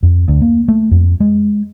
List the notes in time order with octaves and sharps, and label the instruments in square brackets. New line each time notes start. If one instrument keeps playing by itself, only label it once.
[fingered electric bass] F2
D2
A#3
A3
F2
G#3